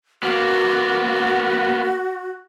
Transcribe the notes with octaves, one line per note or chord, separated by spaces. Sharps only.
A#3 B3 F#4